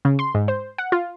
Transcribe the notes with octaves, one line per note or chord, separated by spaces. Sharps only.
C#3
C6
G#2
C5
F#5
F4